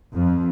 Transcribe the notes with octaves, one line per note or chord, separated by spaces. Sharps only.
F2